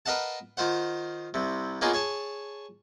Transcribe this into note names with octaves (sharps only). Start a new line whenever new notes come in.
A#4 B4 D#5 F5 F#5 A5
D#3 F4 C5 F#5
C2 C3
A#3 B3 C#4 D#4 F4 G#4
G#4 C#5 A5